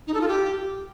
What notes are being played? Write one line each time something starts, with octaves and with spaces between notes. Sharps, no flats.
D#4
A4
F4
G4